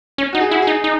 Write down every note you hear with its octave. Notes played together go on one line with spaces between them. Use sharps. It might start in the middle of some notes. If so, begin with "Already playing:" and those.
C#4
D#4 F#4
G#4
E4 F#4
D#4 G#4
D#4